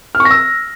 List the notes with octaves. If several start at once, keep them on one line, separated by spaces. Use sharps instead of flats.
F6
C#6
A#6
E6